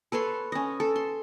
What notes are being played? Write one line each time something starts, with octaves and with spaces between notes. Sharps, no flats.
A4 B4 C#5 C6
C#4 D#5
A4
C6